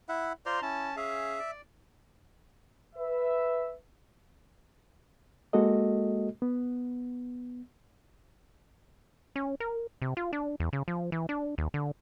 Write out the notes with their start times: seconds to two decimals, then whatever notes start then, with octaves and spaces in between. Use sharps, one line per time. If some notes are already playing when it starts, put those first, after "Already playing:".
0.09 E4 E5 F#5
0.46 F4 C5 D5 A#5 C6
0.62 C#4 E4 A5
0.97 C#4 G#4 E5 F5
1.39 D5
2.96 B4 E5
5.53 G#3 A#3 F#4 A4 D#5
6.42 B3
9.36 C#4
9.60 A#4
10.02 C3
10.17 F4
10.33 D4
10.60 E2
10.73 C#3
10.88 F3
11.12 E3
11.29 D4
11.58 D#2
11.74 D3